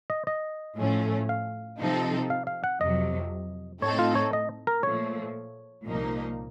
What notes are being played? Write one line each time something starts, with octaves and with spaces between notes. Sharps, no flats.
D#5
D#5
A2 F3 A3 C#4
F5
C3 F3 C4 D#4 A4
F5
F5
F#5
F2 C3 F#3 D#5
A2 A3 C4 D#4 A4 C#5
F4
C#5
D#5
A#4
A#2 F3 A3 C#5
C2 A#2 F3 A#3 D#4